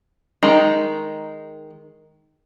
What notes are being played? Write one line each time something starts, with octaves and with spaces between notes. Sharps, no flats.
D#3 G#3 D#4